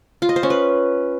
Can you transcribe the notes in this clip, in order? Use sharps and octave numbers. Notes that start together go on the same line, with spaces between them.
F4
D#5
C5
C#4
B4